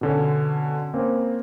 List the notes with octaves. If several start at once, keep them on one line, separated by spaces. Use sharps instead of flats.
B2 D3 C#4
A#3 C4 C#4